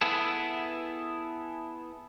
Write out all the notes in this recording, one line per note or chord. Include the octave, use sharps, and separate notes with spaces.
B3 E4 G#4 A4